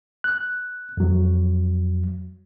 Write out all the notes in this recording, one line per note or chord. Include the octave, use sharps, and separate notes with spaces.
F#6
F2 F#3